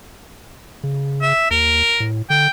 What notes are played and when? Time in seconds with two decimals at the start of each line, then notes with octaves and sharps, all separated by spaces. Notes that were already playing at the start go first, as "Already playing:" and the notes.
0.83 C#3
1.22 E5
1.51 D#2 A#4
2.00 A2
2.30 D3 G5